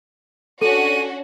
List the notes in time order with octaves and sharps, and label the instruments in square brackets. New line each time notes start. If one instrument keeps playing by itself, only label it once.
[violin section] C#4 D4 F#4 [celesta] A4 [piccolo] D#7